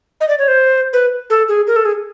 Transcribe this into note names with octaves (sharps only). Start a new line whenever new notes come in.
D#5
D5
C#5
C5
B4
A4
G#4
A#4
A4
G#4